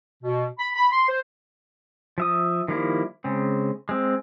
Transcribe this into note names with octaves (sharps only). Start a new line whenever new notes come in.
B2
B5
B5
C6
C5
F3 E5 D#6
D#3 F3 G3 A#3 E4
C#3 G#3 C4
G#3 C4